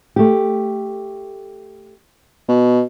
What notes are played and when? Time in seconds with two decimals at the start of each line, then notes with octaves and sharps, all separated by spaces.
0.16 A3 G4
2.48 B2